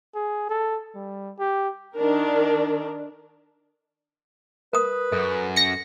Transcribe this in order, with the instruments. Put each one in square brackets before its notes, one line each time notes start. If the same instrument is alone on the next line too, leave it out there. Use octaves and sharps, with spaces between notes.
[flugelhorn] G#4
A4
G3
G4
[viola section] D#3 D4 A#4
[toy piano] A#4 D#6 [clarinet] B4
[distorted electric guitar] F#2 [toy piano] A4
[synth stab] A#6 C#7